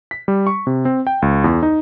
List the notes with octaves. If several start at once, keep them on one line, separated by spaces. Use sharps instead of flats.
B6
G3
C#6
C3
C4
G5
C#2
E2
D#4